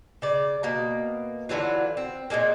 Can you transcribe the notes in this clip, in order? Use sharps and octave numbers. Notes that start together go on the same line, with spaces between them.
C#3 D5
B2 A#3
D3 E3 F#3 F4
C4
A#2 C#3 G#3 A#3